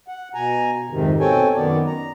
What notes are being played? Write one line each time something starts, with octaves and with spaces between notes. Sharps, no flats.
F#5
B2 G#5 A#5
F2 G#2 C3 D#3
B2 C4 A4 C#5 G5 G#5
F#2 D#3 B3 D5
A#5